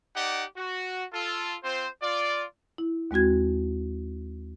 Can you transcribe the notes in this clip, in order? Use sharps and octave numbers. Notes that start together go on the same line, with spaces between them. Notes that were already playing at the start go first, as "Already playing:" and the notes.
D#4 G4 D5 F#5
F#4
F4 A4
C4 F4 C5
F4 D5
E4
D#2 G#3 C4 F#4 G#6